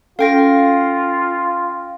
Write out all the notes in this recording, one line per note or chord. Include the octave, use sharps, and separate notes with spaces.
C#4 F4 A4 F5 G5 A#6